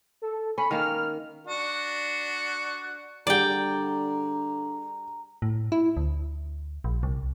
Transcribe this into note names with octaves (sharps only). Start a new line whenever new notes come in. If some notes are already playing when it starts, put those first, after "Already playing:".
A4
C#4 B5
D#3 A#3 F6
D4 F#4
D3 G3 G#4 D5 G5 A#5
A2
E4
D2
A#1
C2